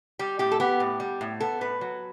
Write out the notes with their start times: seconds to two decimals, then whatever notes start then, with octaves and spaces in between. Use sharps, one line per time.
0.19 G3 G4
0.39 A2 G4
0.52 A4
0.60 B3 G4
0.80 A2
1.00 G3
1.21 A2
1.40 B3 A4
1.61 A2 B4
1.81 F#3